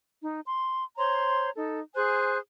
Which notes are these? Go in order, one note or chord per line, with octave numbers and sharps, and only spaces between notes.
D#4
C6
C5 C#5 A#5 C6
D#4 A4
G#4 C5 G#5 F#6